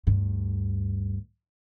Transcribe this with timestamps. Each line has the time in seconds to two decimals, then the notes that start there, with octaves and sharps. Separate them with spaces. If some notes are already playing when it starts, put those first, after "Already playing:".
0.07 D2 G2